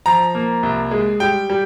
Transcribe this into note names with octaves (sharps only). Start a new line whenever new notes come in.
F3 A#5
A#3
C2
G#3
G3 G5
G3